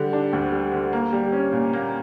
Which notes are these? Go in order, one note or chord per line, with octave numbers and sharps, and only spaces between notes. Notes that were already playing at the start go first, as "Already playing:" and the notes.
Already playing: D3 G3
D4
D2
G3
D3
A#3
G3
C#4
A#2
A#3